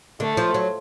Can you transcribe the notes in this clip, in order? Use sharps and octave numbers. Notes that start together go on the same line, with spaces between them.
D3 A3
F3
F#3